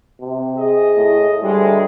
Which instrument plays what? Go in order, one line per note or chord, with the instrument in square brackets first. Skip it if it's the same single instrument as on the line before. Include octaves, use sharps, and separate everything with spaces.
[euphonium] C3
[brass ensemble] G#4 D#5
[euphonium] A2
[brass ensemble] D2 G#3 [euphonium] G3